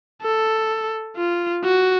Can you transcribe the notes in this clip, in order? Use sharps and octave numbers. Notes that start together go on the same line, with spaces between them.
A4
F4
F#4